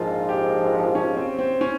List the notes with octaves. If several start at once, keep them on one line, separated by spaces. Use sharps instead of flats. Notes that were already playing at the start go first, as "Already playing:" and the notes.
Already playing: A#1 G#2 F3 F4
G4
C#4
C4
C4
C#4